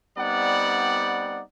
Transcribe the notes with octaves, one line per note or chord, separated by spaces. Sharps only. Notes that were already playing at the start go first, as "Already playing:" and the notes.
G3 B3 C4 D#4 D5 F#5